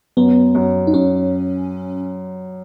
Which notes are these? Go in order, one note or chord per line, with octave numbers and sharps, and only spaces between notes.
F#2 B3
F#2
D#4
F#2 C#4